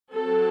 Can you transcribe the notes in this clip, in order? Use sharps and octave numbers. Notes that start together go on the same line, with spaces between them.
F#3 C4 A4